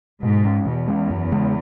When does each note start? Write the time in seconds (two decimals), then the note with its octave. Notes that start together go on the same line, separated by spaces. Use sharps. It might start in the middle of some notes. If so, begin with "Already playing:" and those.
0.23 G#2 B2
0.45 G#3 C#4
0.66 E2 B2
0.88 G#3 C#4
1.10 F#2
1.32 C#3 G#3